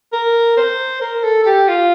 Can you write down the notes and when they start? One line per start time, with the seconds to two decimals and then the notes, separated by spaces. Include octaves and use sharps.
0.13 A#4
0.57 C5
1.01 A#4
1.23 A4
1.43 A4
1.46 G4
1.69 F4